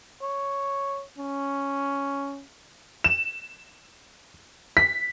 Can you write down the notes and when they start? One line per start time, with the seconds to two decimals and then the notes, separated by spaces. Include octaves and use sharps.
0.22 C#5
1.18 C#4
3.04 E7
4.77 B6